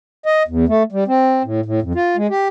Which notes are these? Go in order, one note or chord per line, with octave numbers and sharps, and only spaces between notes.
D#5
E2
A3
G3
C4
A2
A2
F2
F4
G#3
G4